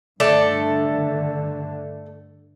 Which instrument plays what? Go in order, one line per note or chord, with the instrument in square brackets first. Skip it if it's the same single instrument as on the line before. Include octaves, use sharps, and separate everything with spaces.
[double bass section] G2 D3 [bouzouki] A3 A4 D5